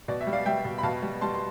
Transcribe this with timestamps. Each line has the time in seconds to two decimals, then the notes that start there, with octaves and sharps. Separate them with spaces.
0.08 B2 D5
0.21 E5
0.27 G3
0.33 D5 F5
0.46 G3 E5 G5
0.65 B2
0.78 B5
0.83 B2 F5 A5
1.03 G3
1.21 G3 A5 C6
1.35 C6